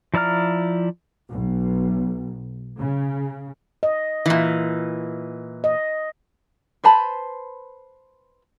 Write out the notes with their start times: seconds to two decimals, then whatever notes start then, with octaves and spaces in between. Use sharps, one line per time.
0.14 F3 E4 D5 A#5 F6
1.30 B1
2.78 C#3
3.83 D#5
4.26 A#2 E3
5.64 D#5
6.84 B4 C5 A5 B5